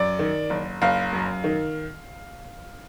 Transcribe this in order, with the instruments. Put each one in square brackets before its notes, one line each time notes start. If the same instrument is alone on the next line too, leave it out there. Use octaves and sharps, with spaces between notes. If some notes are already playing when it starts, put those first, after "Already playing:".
Already playing: [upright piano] F#2 D5
D#3
F#1
F#1 F5
F#2
D#3